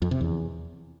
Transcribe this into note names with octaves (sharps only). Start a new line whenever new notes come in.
F2
C3
E2